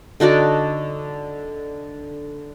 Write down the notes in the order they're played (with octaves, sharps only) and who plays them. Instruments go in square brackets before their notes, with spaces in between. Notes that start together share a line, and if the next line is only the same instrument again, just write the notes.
[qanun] D3 D#4 F#4 D5